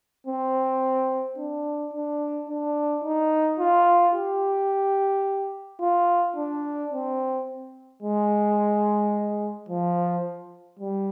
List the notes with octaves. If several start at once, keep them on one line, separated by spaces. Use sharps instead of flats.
C4
D4
D4
D4
D#4
F4
G4
F4
D4
C4
G#3
F3
G3